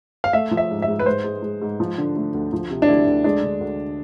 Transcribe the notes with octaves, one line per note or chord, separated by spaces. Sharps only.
F5
A3 E5
F3
E5
G#2
E5
G#2
B4
G#2 C5
G#3
G#3
G#2
F3
D3
A3
D2
F3
C3
D4
D2 E4
D2
G#3 D4
D3
D2